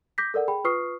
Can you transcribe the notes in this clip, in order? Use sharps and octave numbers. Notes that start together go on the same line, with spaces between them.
D6 G6 A#6 B6
A4 A#4 D5 F#5
G#4 G5 B5
F4 B4 C#6 D#6 F6 C7